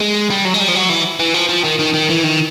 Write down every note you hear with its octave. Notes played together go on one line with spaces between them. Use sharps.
G#3
G3
F#3
G#3
G3
F3
F#3
E3
E3
F3
F3
D#3
D#3
D#3
E3
D#3